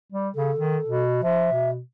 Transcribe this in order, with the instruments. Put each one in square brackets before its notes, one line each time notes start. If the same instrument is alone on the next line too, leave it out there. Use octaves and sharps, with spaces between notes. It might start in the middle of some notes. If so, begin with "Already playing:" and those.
[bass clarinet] G3
[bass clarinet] C#3 [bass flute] A4
[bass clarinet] D#3
B2
[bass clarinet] F3 [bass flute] E5
[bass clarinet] B2